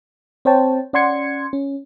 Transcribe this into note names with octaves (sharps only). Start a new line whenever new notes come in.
C4 C5 C#5 G5 A5
C#4 D5 F#5 C6 G#6 C#7
C#4